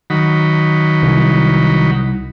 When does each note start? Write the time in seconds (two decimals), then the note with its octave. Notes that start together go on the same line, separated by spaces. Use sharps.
0.10 D#3 F#3 B5
1.02 C2